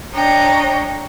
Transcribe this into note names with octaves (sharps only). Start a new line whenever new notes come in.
D4 C#5 D#5 G5 A#5